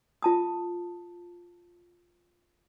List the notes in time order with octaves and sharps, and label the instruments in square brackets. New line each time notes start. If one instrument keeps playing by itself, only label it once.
[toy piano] F4 A5 D#6